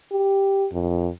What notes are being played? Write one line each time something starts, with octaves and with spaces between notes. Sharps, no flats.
G4
F2